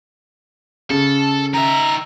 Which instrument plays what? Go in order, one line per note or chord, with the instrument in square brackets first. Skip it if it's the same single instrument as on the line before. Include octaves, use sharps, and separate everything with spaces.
[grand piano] C#3 [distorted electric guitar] A4
[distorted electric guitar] D#3 E5 [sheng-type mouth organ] A#5